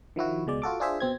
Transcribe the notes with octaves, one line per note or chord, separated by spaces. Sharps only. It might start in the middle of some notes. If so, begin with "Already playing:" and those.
D#3 F3 E4 F#4
C#2 B2 G#3 D5
F4 F#4 A4 D6
D4 F4 G#4 C5 E5
B2 C4 G#6